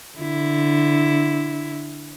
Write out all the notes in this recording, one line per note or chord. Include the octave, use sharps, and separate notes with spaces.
D3 E4